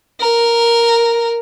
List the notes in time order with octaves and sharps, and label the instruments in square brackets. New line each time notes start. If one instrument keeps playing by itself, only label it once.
[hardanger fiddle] A#4